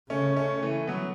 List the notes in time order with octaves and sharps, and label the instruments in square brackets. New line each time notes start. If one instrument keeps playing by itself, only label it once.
[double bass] C#3 [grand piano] A3 C#4
[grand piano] A3 C#4
E3 A3
F#3 B3